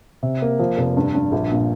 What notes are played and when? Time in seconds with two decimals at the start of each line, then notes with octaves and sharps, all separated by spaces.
0.23 C3
0.42 A#3
0.59 F3
0.77 F1
0.97 G2
1.15 G2
1.32 A#1
1.51 A#2